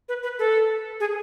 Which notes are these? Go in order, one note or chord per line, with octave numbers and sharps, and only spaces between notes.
B4
B4
A4
G#4